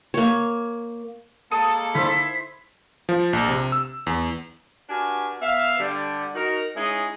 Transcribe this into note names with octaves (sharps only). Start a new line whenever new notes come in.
A#3 C#5
G#3 A#3 A4 A5 D#6
D3 D#4 E4 C5 E5 B6
F3
A#1
C3
E6
E2
D4 F#4 G4 A#4 B4 G#5
B3 E5 F5
D3 G3 D4
D#4 F#4 A#4
G#3 C#4 D#4 E4 G#4